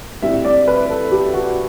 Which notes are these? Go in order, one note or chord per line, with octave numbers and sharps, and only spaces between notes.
A2 G3 C4 E5
D5
B4
A4
G4
F#4